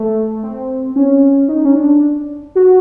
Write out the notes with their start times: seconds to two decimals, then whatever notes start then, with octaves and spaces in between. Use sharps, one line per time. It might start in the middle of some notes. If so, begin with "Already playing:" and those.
Already playing: A3
0.43 C4
0.96 C#4
1.48 D#4
1.65 C#4
1.76 D4
2.55 F#4